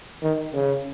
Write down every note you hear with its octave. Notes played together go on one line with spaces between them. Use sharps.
D#3
C#3